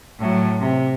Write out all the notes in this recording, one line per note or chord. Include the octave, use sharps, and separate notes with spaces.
A2 F#3
C3